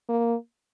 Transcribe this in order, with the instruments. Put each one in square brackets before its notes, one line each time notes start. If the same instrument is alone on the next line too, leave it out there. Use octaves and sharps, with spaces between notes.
[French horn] A#3